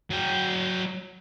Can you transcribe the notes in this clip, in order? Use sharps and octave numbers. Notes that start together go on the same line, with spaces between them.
F#3 G5